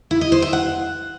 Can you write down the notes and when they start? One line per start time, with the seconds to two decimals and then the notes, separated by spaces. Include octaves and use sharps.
0.11 E4
0.21 D#5
0.32 C5
0.42 E5
0.53 F#5